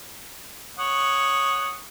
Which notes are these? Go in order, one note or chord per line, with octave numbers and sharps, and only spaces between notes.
C#5 F#5 D#6